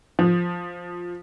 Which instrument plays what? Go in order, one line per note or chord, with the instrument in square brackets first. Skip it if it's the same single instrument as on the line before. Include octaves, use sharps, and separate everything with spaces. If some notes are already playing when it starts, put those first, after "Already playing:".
[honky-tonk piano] F3